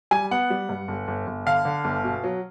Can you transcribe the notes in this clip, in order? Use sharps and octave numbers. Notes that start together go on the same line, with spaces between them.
G3 G#5
B3 F#5
G3
G2
G1
G1
G1
D3 F5
D3
G1
B2
F#3